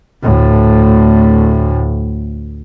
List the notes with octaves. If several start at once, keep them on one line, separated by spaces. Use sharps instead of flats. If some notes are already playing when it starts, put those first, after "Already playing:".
D2 A2